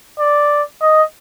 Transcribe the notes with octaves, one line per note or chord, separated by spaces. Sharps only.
D5
D#5